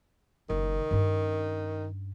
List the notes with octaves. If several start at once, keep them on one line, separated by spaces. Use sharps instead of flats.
F#1 D#3
G2 C#4